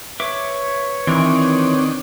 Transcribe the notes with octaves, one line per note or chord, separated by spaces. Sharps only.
B4 C#5 E5 D6
D#3 E3 C4 D4 A#4